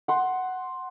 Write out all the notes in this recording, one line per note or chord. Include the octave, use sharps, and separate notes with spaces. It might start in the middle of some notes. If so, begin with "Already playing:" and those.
F#5 C6